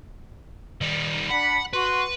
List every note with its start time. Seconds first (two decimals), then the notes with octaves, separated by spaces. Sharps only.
0.81 D#3 G3
1.30 D4 F#5 B5
1.73 F#4 B4 C6